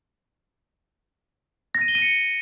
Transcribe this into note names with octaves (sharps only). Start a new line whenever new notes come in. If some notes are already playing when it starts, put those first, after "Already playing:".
A#6
D#7
G7
D#7
C#7